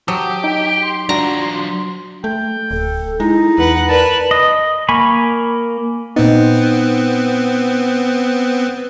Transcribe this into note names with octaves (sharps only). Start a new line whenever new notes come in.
F#3 G4 A5 D6 D#6
D#4 G5 D7
C6
F#3 D4 F4 F#4 A#5
A3 G5
D1 A4
G#3 D#4 E4
E2 B4 F#5
A#4 B4 D5 A5
D#5
A#3 G#5 B5 C#6
A#2 B3 C4 D#4